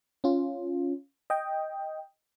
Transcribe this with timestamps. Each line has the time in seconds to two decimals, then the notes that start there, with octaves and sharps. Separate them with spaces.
0.24 C#4 F4
1.30 D#5 G5